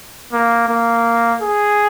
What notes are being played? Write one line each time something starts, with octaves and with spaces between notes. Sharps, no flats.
A#3
A#3
G#4